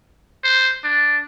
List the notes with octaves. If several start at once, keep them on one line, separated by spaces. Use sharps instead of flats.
C5
D4